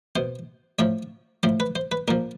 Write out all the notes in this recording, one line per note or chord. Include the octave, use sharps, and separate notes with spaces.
B2 C5
A2 F3 C#5
A2 F3 C5
B4
C5
B4
A#2 F3 A#4